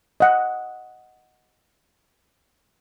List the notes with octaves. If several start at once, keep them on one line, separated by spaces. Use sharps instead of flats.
D#5 F#5